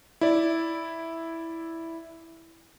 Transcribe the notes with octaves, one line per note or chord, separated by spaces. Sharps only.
E4 D5